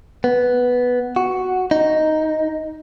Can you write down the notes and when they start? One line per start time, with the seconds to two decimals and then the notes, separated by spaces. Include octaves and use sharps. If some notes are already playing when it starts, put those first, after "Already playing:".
0.24 B3
1.16 F#4
1.71 D#4